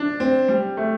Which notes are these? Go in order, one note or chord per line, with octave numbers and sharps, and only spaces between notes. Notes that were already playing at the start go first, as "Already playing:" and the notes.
Already playing: D4
C4
G3
A3